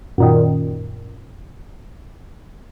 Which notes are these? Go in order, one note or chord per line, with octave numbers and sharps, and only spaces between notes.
F#2 A#2 D#3